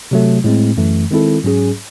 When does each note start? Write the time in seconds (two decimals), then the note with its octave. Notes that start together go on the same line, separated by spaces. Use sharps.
0.11 C3 F#3 A3
0.44 A2 G#3 C4
0.77 F#2 E3 A3
1.11 D#3 G#3 C4 E4 A4
1.44 G#2 F#3 C#4 G#4